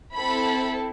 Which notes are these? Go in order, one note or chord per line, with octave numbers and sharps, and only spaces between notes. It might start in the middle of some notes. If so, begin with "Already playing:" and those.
C4 E4 A4 B5